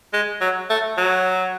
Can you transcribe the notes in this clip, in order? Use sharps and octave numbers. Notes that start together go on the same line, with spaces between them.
G#3
F#3
A3
F#3